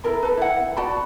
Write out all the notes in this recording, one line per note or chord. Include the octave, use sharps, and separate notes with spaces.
E4 A4 A#4 B5
A4 B4
E4 F#5
F#4 D5 A5 B5